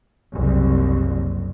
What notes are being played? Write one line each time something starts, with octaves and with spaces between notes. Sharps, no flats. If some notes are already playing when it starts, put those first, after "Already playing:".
F#1 C2